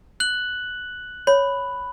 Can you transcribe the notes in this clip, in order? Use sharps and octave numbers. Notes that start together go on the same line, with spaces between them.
F#6 F#7
C#5 B5